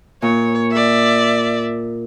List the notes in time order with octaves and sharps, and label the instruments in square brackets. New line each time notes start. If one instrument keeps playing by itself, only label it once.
[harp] A#2 [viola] C#5
[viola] D5 E5